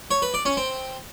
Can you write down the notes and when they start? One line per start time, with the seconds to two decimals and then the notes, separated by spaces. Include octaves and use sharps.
0.11 C#5
0.22 B4
0.34 D5
0.45 C#4
0.57 C4